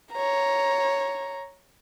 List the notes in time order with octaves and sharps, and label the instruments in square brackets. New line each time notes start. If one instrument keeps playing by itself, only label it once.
[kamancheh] C#5 A#5